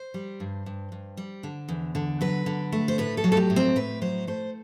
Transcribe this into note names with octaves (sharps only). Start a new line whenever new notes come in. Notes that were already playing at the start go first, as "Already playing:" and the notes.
Already playing: C5
G3
G2
G2
G2
G3
D3
E2
D3
F#3 B4
D3
A3
C5
A2 B4
A4
F#3
A4
G4
A2
C4
A2 B4
F#3 C5
A3 C5